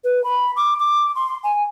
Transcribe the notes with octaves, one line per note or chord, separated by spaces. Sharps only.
B4
B5
D6
D6
C6
G#5